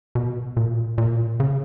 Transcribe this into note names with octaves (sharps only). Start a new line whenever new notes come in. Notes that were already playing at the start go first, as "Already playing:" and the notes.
B2
A#2
A#2
C#3